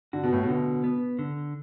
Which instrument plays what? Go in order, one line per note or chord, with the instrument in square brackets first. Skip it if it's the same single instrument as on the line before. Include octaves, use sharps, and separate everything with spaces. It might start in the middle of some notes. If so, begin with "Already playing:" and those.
[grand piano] D3 [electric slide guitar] F#4
[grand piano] B2
A2
B2
[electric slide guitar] D3
B3
D3